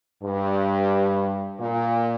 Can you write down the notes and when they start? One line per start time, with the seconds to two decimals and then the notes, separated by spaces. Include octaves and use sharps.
0.23 G2
1.60 A#2